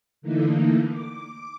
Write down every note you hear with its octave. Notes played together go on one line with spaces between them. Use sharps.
D3 E3 A3 A#3 D#4
D6